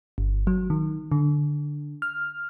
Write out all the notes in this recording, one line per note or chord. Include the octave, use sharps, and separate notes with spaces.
G1
F#3
D#3
D3
F6